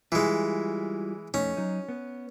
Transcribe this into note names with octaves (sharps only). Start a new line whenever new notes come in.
E3 G3 G#3 E4 F4
F2 A3 C#4 D#4
F#3 D#4
B3